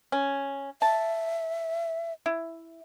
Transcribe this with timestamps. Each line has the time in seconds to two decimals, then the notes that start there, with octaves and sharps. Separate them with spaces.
0.12 C#4
0.82 E5 A5
2.26 E4